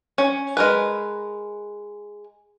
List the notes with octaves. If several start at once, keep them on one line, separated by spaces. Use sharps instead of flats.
C#4
G#3 A#4 B4